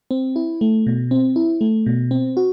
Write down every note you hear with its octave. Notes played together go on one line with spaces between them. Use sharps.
C4
E4
A3
B2
C4
E4
A3
B2
C4
F#4